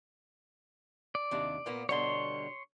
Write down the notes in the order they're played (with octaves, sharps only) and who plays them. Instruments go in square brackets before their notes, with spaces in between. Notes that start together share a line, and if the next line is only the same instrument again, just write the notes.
[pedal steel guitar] D5
[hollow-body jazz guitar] D#2 C3 D4
A#2 A#3 B3
[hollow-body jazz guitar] B2 D3 G3 [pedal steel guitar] C#5 C6